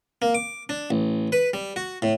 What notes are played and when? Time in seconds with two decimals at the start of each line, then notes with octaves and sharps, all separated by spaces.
0.22 A#3
0.35 D6
0.69 D4
0.91 A1
1.32 B4
1.54 G3
1.76 F#4
2.02 A2